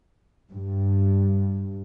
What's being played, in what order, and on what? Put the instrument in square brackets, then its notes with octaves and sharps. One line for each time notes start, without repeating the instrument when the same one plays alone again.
[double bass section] G2